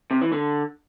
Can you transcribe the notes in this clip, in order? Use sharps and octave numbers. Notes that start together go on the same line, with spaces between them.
C3
E3
D3